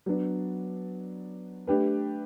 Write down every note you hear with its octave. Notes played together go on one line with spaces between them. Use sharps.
F#3 B3 D4
A3 D4 G4 B4